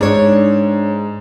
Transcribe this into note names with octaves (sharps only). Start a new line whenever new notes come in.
G#2 D4 C#5